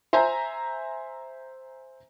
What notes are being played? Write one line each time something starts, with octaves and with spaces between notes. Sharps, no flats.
C5 E5 G#5 A#5